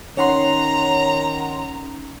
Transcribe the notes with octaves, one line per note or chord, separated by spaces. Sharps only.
D#3 C#4 D#4 C#5 F#5 A#5 C6